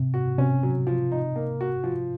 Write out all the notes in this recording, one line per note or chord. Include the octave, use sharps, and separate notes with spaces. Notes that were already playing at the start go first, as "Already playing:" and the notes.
Already playing: C3
F#4
C3 C#4
F#3
F3
D#4
A#3
F#4
F3